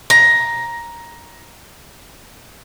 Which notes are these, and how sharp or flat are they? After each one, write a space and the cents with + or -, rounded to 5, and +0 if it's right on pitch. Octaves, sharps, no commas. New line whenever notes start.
A#5 +10